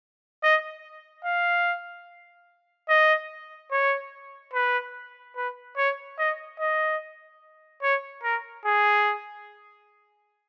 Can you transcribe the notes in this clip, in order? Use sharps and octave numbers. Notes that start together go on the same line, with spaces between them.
D#5
F5
D#5
C#5
B4
B4
C#5
D#5
D#5
C#5
A#4
G#4